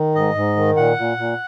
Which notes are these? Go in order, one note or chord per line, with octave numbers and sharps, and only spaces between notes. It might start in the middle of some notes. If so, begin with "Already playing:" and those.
Already playing: D#3
G#2 D#5
G#2
D#3
A#2 F#5
A#2
A#2